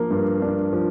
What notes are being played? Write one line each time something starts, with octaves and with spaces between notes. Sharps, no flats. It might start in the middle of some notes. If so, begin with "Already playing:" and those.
Already playing: F3 A#3 D4
G2
D4
F3